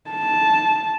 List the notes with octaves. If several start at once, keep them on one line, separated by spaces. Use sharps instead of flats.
A5